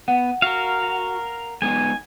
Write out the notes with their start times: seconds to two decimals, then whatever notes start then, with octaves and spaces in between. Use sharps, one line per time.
0.08 B3 F#5
0.42 F#4 A#4 F5
1.62 G#3 B3 D#4 G#5